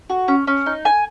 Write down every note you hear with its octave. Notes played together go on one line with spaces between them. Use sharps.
F#4
C#4
C#4
D#4
G#5